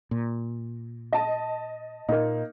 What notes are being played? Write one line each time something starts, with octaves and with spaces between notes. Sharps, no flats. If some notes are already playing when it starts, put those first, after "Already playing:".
A#2
D#5 A5
A#2 A#3 D#4